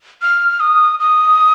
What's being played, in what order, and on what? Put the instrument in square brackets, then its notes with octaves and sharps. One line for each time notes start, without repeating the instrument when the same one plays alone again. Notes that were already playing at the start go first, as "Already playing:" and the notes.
[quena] F6
D#6
D#6